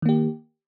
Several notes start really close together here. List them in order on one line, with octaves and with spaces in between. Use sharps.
D#3 A#3 G4